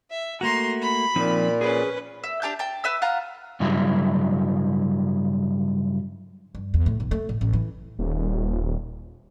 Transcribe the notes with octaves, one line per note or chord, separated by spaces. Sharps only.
E5
A3 A#3 F#4 A#5 C6
B5
A#2 F3 C4 D#4
C#4 G#4 B4
E5
D4 G4 A5 G6
G5 A5
B4 E5 E6
F4 F5 F#5 A#5
G2 C#3 F#3 E4
G2
E2
A2
B1
A3
A2
A1
E3
D#1